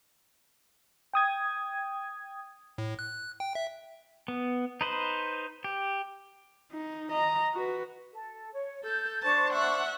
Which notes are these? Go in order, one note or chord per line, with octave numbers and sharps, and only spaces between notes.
G5 D#6 G#6
A2
F#6
G5
E5
B3
D#4 B4 C5
G4
D#4
D#5 A#5
F#4 B4
A4
C#5
A4 G6
D4 C5 A5 C#6
E5 F#5